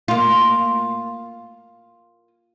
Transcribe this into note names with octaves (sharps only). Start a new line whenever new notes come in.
A#3 F4